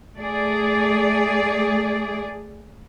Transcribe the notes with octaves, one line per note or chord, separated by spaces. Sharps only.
A3 G#4 D5